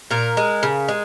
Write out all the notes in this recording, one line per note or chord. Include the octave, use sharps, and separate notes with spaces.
A#2 A#4
G#3
C#3
G#3